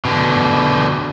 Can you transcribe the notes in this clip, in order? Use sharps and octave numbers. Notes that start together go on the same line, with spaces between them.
B2 D3